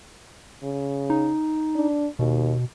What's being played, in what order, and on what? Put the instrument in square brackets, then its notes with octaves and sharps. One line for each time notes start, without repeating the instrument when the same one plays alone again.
[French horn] C#3
[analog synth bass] D#4
[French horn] D4
[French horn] D#2 [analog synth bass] B2